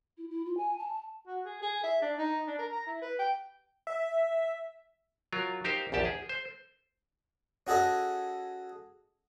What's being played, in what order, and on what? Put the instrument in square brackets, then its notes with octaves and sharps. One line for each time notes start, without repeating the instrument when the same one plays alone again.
[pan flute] E4
E4
F4
G#5
A5
A5
[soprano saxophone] F#4
G#4
G#4
E5
D4
D#4
D4
A#4
A#5
E4
B4
G5
[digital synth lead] E5
[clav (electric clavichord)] F#3 F4 A#4
D#4 G4 A#4 C5 F5
A#1 E2 G4 A5
G#4
C5
[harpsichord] C#4 F#4 G#4 A4 D#5